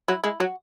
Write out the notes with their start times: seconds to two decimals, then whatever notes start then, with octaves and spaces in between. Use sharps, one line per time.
0.08 F#3 E4
0.24 G#3 E4
0.40 F#3 F#4